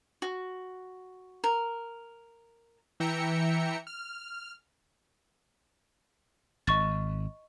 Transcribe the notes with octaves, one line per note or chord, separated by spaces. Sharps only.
F#4
A#4
E3 E5 G5 A#5 C#7
F6
G#1 D#5 C#6 A6